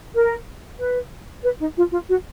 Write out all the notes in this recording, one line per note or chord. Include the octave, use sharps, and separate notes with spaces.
A#4
B4
B4
D#4
F4
F4
F#4